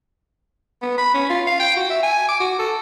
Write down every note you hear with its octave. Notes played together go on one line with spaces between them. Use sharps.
B3
B5
C#4
F4
F5
G5
F#4
E5
G#5
D6
F#4
A4